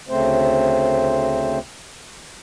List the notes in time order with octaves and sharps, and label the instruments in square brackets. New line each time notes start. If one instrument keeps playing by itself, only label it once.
[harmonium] D2 C#3 A3 C4 C5